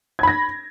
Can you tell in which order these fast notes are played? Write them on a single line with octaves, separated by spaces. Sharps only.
G#6 B5 A#6